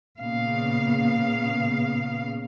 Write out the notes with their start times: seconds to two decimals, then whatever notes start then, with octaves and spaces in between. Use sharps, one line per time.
0.19 A#2 C#3 B3 F5